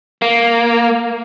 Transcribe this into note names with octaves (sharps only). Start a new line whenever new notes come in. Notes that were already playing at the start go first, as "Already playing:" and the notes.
A#3